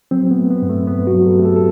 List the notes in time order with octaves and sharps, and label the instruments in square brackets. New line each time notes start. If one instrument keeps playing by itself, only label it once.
[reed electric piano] F#3 C4
B3
A3
B3
G2
A3
G2 B3
F#4
F#3
A4
A3 G4
A4
A4